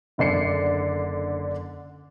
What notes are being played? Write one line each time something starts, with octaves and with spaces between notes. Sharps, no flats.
F#1 D3 D5 C7 C#7